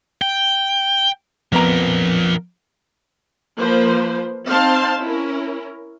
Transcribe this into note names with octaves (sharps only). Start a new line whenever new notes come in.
G5
F2 F3 B3 A#4 A#5
F3 A#3 B4 C5
C4 D#4 C5 F5 A5 C6
C#4 E4 A#4